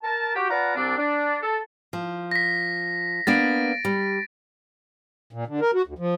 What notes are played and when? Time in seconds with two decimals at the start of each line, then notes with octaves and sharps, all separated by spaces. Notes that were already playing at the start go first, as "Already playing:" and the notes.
0.03 A#4 A5
0.35 F#4 G4
0.50 F4 B4 D5 F#5 A5 A#5
0.76 C2 C4 D4
0.97 D4
1.42 A4
1.93 F3
2.31 A#6 B6
3.27 A#3 B3 D4 A6 D7
3.85 G3
5.33 A#2
5.47 D3
5.61 A#4
5.74 F#4
5.87 D2
5.99 F3